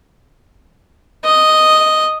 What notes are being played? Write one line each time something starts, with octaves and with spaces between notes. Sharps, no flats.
D#5